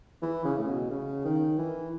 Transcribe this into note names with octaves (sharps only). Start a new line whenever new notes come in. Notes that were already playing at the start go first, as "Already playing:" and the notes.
E3
C#3
A2
B2
C#3
D#3
E3